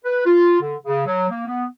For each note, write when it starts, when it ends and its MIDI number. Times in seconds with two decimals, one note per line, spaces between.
0.05 0.22 71
0.26 0.59 65
0.61 0.75 50
0.85 1.03 49
1.06 1.26 54
1.29 1.46 58
1.47 1.65 59